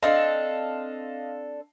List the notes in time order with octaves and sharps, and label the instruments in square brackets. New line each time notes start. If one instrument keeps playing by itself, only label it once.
[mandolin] C4 D4 A4 [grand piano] D#5 F5